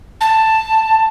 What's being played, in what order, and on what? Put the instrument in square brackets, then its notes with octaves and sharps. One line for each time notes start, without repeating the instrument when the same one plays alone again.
[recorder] A5